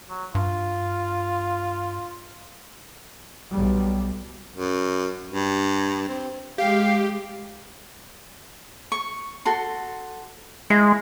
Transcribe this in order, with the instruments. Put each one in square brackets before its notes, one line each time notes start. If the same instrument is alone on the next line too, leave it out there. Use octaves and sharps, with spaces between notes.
[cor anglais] F#3
[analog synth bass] G2 [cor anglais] F4
[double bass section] B1 G3
[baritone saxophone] F#2
G2
C4
[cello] G#3 [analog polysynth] G4 [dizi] F5
[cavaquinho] C#6
F#4 A4 C6
[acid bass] G#3 [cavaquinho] E4